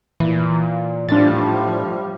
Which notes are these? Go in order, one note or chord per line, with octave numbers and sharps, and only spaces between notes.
A#2 E3
A2 F3 G3 D4 A6